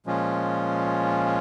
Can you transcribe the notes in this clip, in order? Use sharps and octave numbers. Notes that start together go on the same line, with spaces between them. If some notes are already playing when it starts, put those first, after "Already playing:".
A#2 F3 G#3 C#4 F4